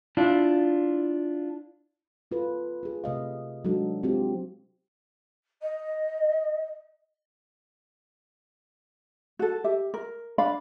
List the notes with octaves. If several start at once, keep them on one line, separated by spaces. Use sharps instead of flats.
D4 E4 F4
C#4 F4 A4 B4
F4 G#4
C3 A3 D#5 F5
F#3 G#3 D4 D#4 F#4 A4
G#3 C4 F4 G4
D#5
F#4 A4
G4 E5
A#4
D4 D5 F5 B5